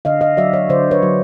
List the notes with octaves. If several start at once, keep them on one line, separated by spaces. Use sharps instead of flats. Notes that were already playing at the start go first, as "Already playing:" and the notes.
D3 D#5 F5
D#5 F5
F#3 D5 E5
C#5 D#5
D3 C5 D5
B4 C#5
F#3